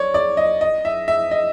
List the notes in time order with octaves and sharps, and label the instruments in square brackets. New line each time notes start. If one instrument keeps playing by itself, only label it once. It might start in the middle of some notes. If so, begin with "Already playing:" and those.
Already playing: [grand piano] C#5 D5
D5
D#5
D#5
E5
E5
D#5